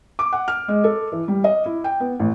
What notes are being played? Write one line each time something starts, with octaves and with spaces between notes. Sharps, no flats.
D6
F#5
F6
G#3
A4
E3
G3
D#5
E4
G5
B3
A1